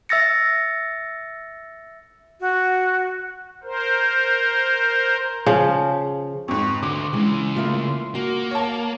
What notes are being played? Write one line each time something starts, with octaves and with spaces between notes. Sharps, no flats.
E5 E6 A6 A#6 C#7
F#4
A#4 C5
C#3 F3
F2 G#2 B4 C#6
D2 D3 C6 D6
C#2 C#3 E3 G#3
A3 A#3 F4 E5
A#3 F#4
C#5 A5